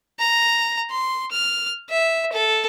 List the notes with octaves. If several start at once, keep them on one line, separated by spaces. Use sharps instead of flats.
A#5
C6
F6
E5
A4